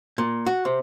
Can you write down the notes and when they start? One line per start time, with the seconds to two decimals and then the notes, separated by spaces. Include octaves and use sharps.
0.18 A#2
0.46 F#4
0.65 C3